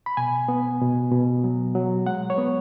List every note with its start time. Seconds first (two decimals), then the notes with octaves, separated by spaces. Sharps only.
0.06 B5
0.17 B2 G#5
0.48 B3
0.81 B2
1.12 B2
1.44 F#3
1.75 F#3
2.06 G#3 F#5
2.30 C#5
2.38 B3